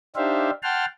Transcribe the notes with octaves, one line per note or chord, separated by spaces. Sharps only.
D4 D#4 G4 C5 E5 F5
F#5 G5 A5 C6 F6